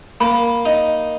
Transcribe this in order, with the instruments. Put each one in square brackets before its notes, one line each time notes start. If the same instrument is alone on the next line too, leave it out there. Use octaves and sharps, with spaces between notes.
[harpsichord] A#3 [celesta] B5
[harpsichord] D#4